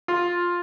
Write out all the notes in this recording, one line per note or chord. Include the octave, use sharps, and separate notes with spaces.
F4